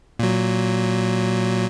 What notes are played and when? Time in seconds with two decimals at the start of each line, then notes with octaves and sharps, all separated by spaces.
0.19 A#2 F#3